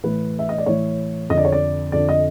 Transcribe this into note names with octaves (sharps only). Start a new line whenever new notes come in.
A2 E3 B4
E5
D#5
D5
A2 E3 C#5
F2 D3 D5 D#5
C#5
D5
F2 D3 D5
D#5